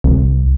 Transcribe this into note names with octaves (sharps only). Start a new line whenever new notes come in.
C2